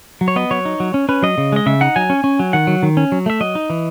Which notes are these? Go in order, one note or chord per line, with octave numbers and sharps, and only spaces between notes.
F#3
C#5
B3 D#5
F#3 C#5
D#4
F#3
C#4
C#4 B4
F#3 D#5
C#3
G#3 D#5
C#3 E5
D#4 F#5
F#3 G#5
C#4
C#4
F#3
D#3 F#5
F#3
D#3
C#4
F#3
A3 E5
F#3 D#5
D#4
E3